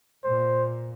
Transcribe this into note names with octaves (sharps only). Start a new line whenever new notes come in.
A#2 C5